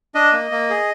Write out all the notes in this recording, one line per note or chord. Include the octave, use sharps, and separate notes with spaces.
D4 D#5
A#3
A#3
G#4